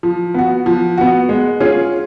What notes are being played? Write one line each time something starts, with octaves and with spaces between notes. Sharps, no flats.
F3
B3 F#4
F3
B3 F#4
G#3
C#4 F4 G#4